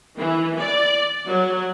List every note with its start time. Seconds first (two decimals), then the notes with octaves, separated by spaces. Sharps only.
0.18 E3
0.59 D5
1.27 F#3